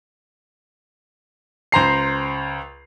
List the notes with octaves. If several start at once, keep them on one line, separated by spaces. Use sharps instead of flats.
C#2 C5 A#5 C7